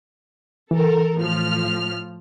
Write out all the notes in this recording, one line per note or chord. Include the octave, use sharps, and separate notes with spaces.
E3 A4 A#4
A2 F3 F6